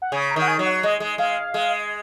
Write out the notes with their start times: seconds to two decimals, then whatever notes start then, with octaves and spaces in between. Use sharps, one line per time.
0.02 F#5
0.12 C#3 G#5
0.30 A#5
0.36 D#3
0.42 F#5
0.48 G#5
0.59 F#3
0.66 F#5
0.83 G#3 D#5
1.00 G#3
1.18 G#3 F5
1.54 G#3